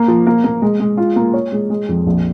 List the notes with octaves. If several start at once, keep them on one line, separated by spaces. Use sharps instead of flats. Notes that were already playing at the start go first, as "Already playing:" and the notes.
Already playing: A#3
F3
A#3
A#3
G#3
G#3
F4
A#3
C#5
G#3
G#3
F2
A#1